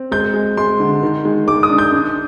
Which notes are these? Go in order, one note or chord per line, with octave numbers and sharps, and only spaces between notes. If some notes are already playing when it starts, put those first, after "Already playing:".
Already playing: C4
G#3 G6
G#3
G#3 C6
D3
D#3
G#3
G#3 D6
D#6
D4
G6
D4